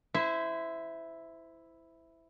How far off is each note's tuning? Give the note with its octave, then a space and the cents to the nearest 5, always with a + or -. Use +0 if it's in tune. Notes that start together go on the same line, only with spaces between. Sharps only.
E4 +0 C5 -30 E5 +0